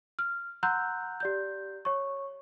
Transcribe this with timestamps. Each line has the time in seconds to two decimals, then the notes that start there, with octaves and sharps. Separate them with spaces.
0.19 F6
0.63 F#5 A#5 C6 E6 F#6 G6
1.20 G4 D5 G6
1.85 C#5 C#6